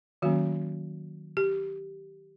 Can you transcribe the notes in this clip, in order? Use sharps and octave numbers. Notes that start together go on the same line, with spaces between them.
D#3 F#3 A#3 C#4 F#4
G4